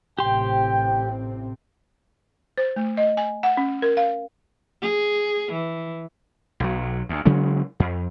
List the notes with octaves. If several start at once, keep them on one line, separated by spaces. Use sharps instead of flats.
A1 C3 C4 G4 G5 C6
C5
A3
D#5
G#5
F#5
C#4
A#4
F5
G#4
E3
B1 F#3
D2
C#3 F#3 G#3 C#4
F2